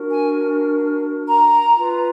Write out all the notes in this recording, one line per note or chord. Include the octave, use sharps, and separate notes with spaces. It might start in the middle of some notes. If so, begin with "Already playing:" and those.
Already playing: D4 F#4 A#4
G#5
A#5
F4 B4